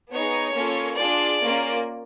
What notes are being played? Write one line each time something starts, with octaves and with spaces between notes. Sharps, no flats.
B3 D#4 G#4 C#5
A#3 C#4 F4 A4
D4 F4 G#4 D5
A#3 C#4 F4